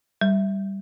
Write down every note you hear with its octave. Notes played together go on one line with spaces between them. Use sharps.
G3